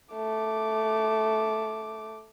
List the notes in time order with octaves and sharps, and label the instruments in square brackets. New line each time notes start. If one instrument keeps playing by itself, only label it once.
[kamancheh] A3 D6